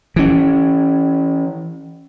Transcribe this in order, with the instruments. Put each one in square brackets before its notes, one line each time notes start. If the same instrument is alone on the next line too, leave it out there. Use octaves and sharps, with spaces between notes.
[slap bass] E3 C#4